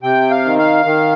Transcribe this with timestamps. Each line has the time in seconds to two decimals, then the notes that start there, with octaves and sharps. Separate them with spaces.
0.03 C3 G5
0.31 F5
0.45 D#3
0.59 F5
0.85 D#3